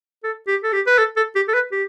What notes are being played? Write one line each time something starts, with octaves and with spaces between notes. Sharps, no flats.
A4
G4
A4
G4
B4
A4
A4
G4
A4
B4
G4